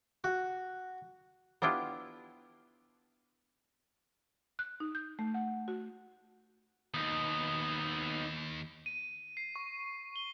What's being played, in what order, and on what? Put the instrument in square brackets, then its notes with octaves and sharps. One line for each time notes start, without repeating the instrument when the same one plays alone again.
[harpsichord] F#4
[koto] B3 D4 E4 F4 G4
[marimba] F#6
D#4
G6
A3
F#5
F#4
[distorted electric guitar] D#2 [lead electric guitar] B3 D#4
[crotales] D#7
C7
C#6
G7